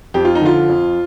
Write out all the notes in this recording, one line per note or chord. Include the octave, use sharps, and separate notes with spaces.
F2 G4
F4
D#4
D3 F3 F4
F2